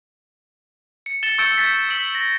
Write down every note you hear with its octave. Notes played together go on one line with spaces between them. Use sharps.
C#7
A6 C#7 E7 G7
C#6 E6 G6 A6 C#7 D7
G6 A6 B6 C#7
E6 B6 D7 F#7
A#6